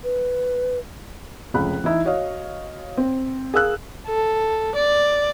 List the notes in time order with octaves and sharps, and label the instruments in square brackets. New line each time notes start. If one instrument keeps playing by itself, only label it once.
[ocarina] B4
[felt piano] F1 C#2 B5 F#6
E3 D#4 E4
F#4 C#5 D#5 F5
C4
G#4 A#4 F5 E6 F#6
[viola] A4
D5